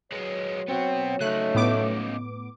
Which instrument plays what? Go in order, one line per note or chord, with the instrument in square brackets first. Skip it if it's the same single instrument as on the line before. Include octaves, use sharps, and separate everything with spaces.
[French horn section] F#3 C#5 [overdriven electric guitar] G#3 B3
[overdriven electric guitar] B3 F#4 [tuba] C4
[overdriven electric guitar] C#3 D#4 [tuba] A3 [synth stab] F#6
[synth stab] A2 B3 D6